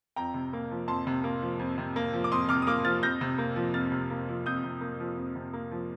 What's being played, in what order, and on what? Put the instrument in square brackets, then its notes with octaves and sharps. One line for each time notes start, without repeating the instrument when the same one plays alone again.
[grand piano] F2 G5 A#5
C3
A#3
F3
F2 A5 C6
C3
A#3
F3
F2
C3
A#3
F3
D6
F2 C6 D#6
C3 D6 F6
D#6
A#3 D6 F6
F3 F6 A6
F2 G6 A#6
C3
A#3
F3
F2 F6 A6
C3
A#3
F3
F2 D#6 G6
C3
A#3
F3
F2
C3
A#3
F3